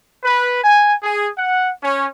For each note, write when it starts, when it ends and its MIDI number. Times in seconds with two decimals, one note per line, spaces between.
0.24 0.63 71
0.63 0.94 80
1.02 1.29 68
1.37 1.69 78
1.82 2.06 61